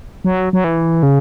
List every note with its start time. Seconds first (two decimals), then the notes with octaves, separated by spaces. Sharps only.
0.25 F#3
0.53 F#3
0.64 E3
1.03 C#3